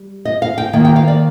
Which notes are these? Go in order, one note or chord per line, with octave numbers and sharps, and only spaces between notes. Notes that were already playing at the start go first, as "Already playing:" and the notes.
Already playing: G3
D#5
F5
G5
D#3 A#3 G5
G5
F5
D5